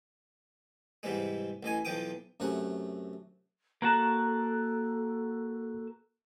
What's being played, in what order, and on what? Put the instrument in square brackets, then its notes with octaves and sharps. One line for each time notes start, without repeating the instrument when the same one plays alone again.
[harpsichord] G#2 C3 E3 G3 G#3
A1 E3 D#5 G#5
B1 E3 F3 G5 D6 D#6
F#2 C3 A3 F#5 G#5
[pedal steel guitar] A#3 F#4 A5 [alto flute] A4 [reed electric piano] A#5 F#6